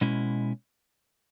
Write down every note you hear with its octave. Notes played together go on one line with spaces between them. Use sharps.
B2 G#3 C#4 E4